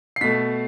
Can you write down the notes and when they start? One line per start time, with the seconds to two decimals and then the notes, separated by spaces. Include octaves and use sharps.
0.16 C7
0.21 B2 A3 B6